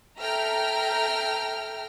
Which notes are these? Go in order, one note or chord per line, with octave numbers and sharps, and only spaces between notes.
A4 E5 G5 A#5 F6